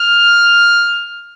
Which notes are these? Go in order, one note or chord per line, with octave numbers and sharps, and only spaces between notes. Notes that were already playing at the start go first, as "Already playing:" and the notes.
Already playing: F6